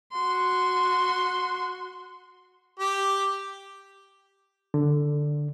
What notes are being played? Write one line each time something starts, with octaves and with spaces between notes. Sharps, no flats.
F#4 C6
G4
D3